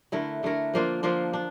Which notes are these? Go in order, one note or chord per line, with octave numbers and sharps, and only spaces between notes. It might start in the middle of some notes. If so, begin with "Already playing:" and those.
D3 A3 E4 A#4
D3 A3 E4 A#4
F3 A#3 D4 F4
F3 A#3 D4 F4
D4